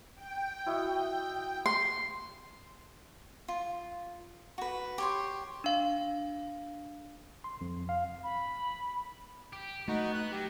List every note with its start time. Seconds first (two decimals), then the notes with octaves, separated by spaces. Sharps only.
0.15 G5
0.66 E4 F#4 D#5
1.66 C6
3.48 F4
4.58 F#4 B4
4.98 G4 C#5 C6
5.64 D4 F5
7.44 C6
7.61 F2
7.89 F5
8.23 B5
9.53 G4
9.88 A3 B3 D#4 F#4
10.14 F#6
10.32 F#3 G4